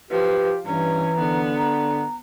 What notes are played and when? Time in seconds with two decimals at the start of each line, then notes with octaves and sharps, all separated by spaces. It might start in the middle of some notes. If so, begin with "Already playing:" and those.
0.11 F3 G4 B4
0.66 G2 E3 C#4 A#5
1.19 D3 B3
1.57 A#5